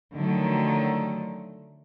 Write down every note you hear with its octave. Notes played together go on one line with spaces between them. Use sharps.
D3 D#3 F3 F#3 A3